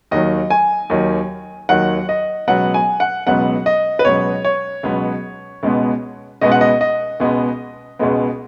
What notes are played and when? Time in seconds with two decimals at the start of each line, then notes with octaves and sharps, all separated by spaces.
0.11 D#2 D#3 F#3 D#5
0.50 G#5
0.90 D#2 D#3 F#3
1.69 D#2 D#3 F#3 F#5
2.09 D#5
2.48 C#2 B2 F#3 B3 F#5
2.74 G#5
3.00 F#5
3.27 C#2 B2 F#3 B3 F#5
3.66 D#5
3.99 B4
4.05 C#2 B2 F#3 B3 C#5
4.45 C#5
4.83 C#2 B2 F#3 B3
5.63 C#2 B2 G#3 B3
6.41 C#2 B2 G#3 B3 D#5
6.52 F#5
6.61 D#5
6.81 D#5
7.20 C#2 B2 G#3 B3
7.99 C#2 B2 G#3 B3